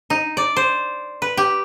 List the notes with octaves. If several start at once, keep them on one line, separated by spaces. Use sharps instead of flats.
D#4
D5
C5
B4
G4